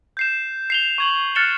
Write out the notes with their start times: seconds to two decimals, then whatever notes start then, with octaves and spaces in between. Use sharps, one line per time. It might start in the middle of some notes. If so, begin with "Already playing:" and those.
0.17 G6 C7 E7
0.70 C7 F7 G7
0.98 C#6 G#6 F#7
1.35 F6 F#6 A6 C#7 E7 G7